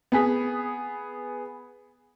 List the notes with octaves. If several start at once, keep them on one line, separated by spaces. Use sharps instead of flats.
B3 G#4 B6